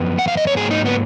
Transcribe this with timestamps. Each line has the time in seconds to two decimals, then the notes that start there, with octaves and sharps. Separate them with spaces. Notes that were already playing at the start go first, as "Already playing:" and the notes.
Already playing: F#2 F3 B3
0.19 F#5
0.28 F5
0.37 D#5
0.47 C#5
0.56 G#2 F#3 A#3 G#4
0.71 D#4
0.86 B3